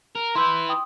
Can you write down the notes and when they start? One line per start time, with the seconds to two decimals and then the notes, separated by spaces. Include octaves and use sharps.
0.15 A#4
0.35 E4 B4 C6 E6 G6
0.69 G5 D#6